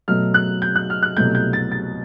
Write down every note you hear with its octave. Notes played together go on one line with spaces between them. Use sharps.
B2 F#3 A3 F6
F#6
G6
F#6
F6
F#6
C2 B2 F#3 A3 G6
G6
A6
A6